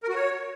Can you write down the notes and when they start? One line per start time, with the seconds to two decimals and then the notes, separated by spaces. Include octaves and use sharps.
0.03 A#4
0.09 F#4
0.15 C#5